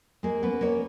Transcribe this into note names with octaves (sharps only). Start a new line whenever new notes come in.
G#3 A#3 G#4
B3 C#4 B4
A#3 C#4 C#5